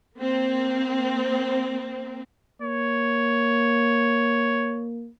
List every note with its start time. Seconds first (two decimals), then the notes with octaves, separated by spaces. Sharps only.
0.19 A#3 C4
2.62 A#3 C#5